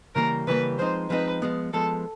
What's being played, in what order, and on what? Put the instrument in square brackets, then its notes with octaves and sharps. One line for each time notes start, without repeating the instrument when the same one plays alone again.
[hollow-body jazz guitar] C#3 E3 G3 A#3 [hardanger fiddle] A#4
[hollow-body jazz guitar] C#3 E3 G3 A#3 [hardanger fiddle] B4
[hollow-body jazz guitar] F3 G#3 C4 D#4 [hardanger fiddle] C5
[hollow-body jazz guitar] F3 G#3 C4 D#4 [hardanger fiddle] B4
[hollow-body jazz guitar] F3 G#3 B3
[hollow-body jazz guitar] F3 G#3 B3 [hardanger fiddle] A4